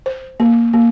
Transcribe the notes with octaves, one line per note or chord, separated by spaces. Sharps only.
C5
A#3
A#3